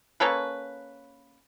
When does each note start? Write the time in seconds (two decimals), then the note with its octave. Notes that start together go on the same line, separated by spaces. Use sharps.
0.20 A#3 C#4 A4 B4